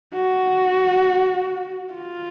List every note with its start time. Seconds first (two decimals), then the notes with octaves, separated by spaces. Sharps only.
0.14 F#4
1.94 F4